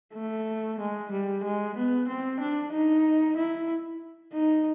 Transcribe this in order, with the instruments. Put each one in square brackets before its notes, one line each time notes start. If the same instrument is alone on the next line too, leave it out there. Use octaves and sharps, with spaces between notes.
[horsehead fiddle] A3
G#3
G3
G#3
B3
C4
D4
D#4
E4
D#4